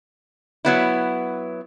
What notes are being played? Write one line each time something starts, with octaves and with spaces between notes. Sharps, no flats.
F#3 B3 E4